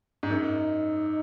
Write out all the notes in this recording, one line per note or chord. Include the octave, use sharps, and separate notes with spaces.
G#2
F#2 D#4